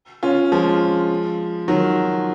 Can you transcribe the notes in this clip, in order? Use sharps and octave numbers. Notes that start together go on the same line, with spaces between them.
C#4 F4
F3 G#3
D#3 F#3